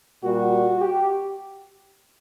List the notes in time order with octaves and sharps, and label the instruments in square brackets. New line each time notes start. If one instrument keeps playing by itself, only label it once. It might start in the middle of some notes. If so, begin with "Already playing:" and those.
[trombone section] A#2 G3 F#4
G4